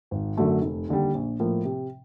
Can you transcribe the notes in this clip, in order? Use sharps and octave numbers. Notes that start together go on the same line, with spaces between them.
G#1
F#2 D3 F#3 A3
F1
D#2 D3 G3
A#1
A2 F3 A#3
C3